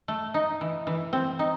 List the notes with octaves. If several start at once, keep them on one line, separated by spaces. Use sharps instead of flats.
A3
D#4
E3
E3
C4
D#4